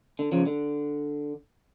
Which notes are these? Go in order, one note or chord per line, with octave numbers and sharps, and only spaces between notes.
D3
C#3 F3
D3